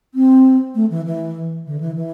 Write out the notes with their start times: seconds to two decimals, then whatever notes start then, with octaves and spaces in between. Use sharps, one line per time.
0.15 C4
0.75 A3
0.90 E3
1.06 E3
1.66 D3
1.80 E3
1.96 E3